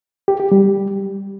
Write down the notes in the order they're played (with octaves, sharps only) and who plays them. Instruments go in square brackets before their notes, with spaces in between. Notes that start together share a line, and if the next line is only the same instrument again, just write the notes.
[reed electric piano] G4
G4
G3